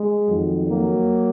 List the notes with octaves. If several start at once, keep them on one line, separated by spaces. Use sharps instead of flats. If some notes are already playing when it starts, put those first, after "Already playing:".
Already playing: G#3
F2 D#3 F#3
F#3 A#3